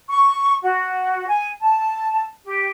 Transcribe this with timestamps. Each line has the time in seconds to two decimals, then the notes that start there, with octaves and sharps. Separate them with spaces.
0.09 C#6
0.62 F#4
1.28 G#5
1.60 A5
2.45 G4